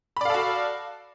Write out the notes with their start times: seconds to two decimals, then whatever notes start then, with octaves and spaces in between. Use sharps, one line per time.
0.17 B5
0.21 D5
0.25 F5
0.30 A4
0.34 F#4